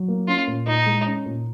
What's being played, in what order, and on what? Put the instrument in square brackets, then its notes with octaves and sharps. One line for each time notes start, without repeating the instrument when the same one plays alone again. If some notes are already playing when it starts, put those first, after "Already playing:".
Already playing: [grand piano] F#3
A#3
[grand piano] C#4 [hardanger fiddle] F4
[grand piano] A#2
[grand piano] A#2 [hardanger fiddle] D#4
[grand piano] G#3
C#4
A#2